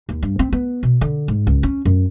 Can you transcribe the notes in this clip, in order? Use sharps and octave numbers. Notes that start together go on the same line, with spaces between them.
D#2
G2
C4
B3
B2
D3
G#2
C#2
C#4
F#2